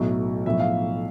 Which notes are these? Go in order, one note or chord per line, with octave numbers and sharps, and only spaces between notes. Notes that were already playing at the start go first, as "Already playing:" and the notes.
Already playing: B1 A2 F#3
B1 A2 F3 E5
F5